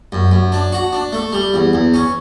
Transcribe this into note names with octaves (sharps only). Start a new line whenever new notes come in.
F#2
F#2
D4
F#4
D4
A3
G3
E2
E2
C#4